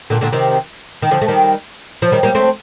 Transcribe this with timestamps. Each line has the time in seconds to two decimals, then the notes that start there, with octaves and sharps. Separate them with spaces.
0.10 A#2 D3
0.21 A#2 D3
0.32 C3 D#3
1.02 D#3
1.11 D3 F3
1.21 A3
1.28 D#3 G3
2.02 F3
2.12 D#3 G3
2.23 G3 A#3
2.35 A3 C4